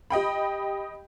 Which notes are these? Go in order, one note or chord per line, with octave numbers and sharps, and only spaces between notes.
G4 D#5 G5 B5